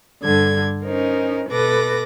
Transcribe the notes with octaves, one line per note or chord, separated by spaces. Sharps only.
G2 D3 A4 G#6
C#4 D#4 A#4 C5
B2 A4 B4 D6 A#6